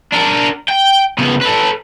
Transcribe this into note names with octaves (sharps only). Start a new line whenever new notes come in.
D4 A#4
G5
C#3 B3
A4 B4